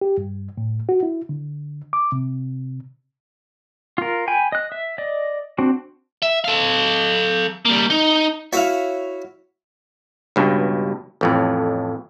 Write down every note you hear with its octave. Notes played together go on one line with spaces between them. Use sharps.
G4
G2
A2
F#4
E4
D3
D6
C3
F4 A#4
G5 G#5 B5
D#5 F#6
E5
D5 D#5
C4 D4 F#4
E5
A4 F5
G3 A#3
D#4
E4 F#4 C#5 E5 F5
C#2 G2 B2
A1 F2 A2